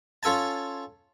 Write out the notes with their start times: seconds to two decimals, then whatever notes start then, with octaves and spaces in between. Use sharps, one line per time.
0.23 C#4 F4 A4 G#5 A5